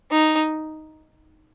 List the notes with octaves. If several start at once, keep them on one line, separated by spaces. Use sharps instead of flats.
D#4